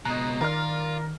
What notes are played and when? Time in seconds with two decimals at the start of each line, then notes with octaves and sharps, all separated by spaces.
0.05 C#2 B2 D#5 A#5 F#6
0.41 D#3 F4 A#4 D5 F6